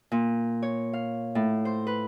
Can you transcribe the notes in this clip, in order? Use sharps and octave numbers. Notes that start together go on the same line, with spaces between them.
A#2
C#5
F5
A2
C5
B4